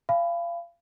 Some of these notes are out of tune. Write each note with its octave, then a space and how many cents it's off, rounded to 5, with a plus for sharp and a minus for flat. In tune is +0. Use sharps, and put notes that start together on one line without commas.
F5 -30 G#5 +0 B5 +10